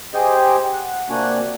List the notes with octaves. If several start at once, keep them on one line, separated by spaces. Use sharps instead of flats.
G4 G#4 C5 D#5 G5
F#5
C3 A#3 D4 F#4 G#5 F#6